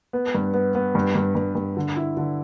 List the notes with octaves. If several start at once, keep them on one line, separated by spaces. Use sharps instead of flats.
B3
G2
B3
B3
G2
G2
G2
G2
D3
E4
D3